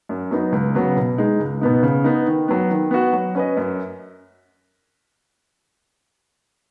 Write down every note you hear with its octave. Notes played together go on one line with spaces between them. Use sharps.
F#2
F#3 B3 D#4
C#2
C#3 F#3 B3
B2
G#3 D#4
C#2
B2 B3 D#4
C#3
B3 D#4
D#3
F#3 B3
D#3
B3 F#4
F#3
C#4 B4 D#5
F#2